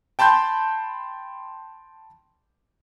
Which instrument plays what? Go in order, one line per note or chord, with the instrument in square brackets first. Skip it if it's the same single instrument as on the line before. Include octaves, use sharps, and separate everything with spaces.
[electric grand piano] G5 A5 B5 C6 G6